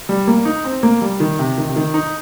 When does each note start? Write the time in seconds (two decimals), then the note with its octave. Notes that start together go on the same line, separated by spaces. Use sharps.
0.09 G3
0.27 A#3
0.45 D#4
0.65 C4
0.83 A#3
1.01 G3
1.20 D#3
1.39 C3
1.58 D#3
1.69 C3
1.76 D#3
1.94 D#4